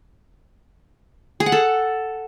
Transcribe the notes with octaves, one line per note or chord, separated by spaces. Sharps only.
G#4
F#5
A4